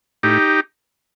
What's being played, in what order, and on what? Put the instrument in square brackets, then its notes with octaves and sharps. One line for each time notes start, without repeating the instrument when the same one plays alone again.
[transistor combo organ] A2 D#4 G4